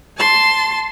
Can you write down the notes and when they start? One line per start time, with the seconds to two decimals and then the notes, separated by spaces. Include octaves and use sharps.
0.17 A5 C6